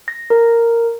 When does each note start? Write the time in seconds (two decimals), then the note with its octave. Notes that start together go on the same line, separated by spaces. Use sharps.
0.08 A#6
0.30 A#4